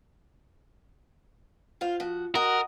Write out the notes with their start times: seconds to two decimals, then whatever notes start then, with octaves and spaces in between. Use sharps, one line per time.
1.81 F4 C5 F5
2.00 F3 F#4
2.35 F#4 A#4 D#5